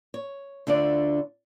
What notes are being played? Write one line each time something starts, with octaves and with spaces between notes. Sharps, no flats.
C#5
D2 D3 D4 F4 D5